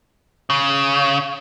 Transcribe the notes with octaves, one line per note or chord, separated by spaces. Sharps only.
C#3